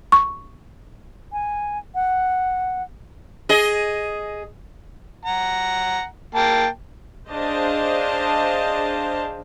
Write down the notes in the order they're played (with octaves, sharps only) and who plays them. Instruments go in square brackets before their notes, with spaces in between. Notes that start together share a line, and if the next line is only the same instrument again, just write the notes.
[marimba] C#6
[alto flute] G#5
F#5
[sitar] G#4 D#5
[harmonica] F#5 A#5
A#3 G5 A5
[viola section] D4 G#4 C5 D#5 F5 A5